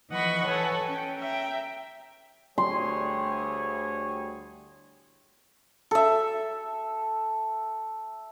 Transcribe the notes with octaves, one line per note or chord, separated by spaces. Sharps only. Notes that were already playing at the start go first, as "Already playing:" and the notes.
E3 F3 D#5 F#5 B5 C#6
A4 B4 C#5 F#5 G#5
C#4 G5
E5 G5 A#5
D2 G3 G#4 C#5 C6
A4 E5